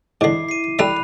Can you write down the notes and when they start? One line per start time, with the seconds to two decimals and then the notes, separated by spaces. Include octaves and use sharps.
0.21 G#2 D3 E4 D6 C7
0.49 C7 D#7
0.79 G3 A3 E5 B5 F#6 F7